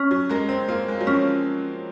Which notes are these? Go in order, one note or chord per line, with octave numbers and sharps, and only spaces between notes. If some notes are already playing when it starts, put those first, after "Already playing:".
Already playing: C#4
F#3
G#3 A#4
C4
A#3 F4
G#3
F#3
F3 C#4